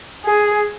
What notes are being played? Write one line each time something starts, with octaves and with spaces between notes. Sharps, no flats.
G#4